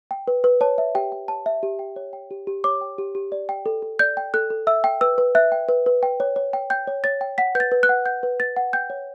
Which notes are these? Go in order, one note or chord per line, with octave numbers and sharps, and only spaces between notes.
G5
B4
B4
C#5 A5
E5
G4 G5
G5
C#5 A5
E5
G4
G5
C#5
G5
G4
G4
C#5 D6
G5
G4
G4
D5
G5
A4
A4
D5 G6
G5
A4 F#6
A4
E5 E6
G5
B4 E6
B4
E5 F#6
G5
B4
B4
G5
C#5
C#5
G5
G5 G6
C#5
C#5 A6
G5
F#5 B6
B4 G6
A6
B4
F#6
F#5
F#5 G6
B4
B4 A6
F#5
G5 G6
C#5